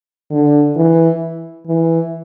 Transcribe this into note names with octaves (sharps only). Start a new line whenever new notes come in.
D3
E3
E3